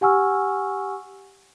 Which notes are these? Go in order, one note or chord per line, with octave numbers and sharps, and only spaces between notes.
G4 F#5 G#5 C#6 E6 F6